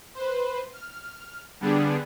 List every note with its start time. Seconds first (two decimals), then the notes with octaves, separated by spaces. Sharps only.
0.15 B4 C5
0.73 F6
1.60 D3 G3 B3 D4 G#4